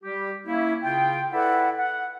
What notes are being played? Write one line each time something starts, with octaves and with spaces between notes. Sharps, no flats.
G3 G4
A#3 C#4 E4
C#3 F4 G5
E4 A4 B4 D5 E5 F#5
F#5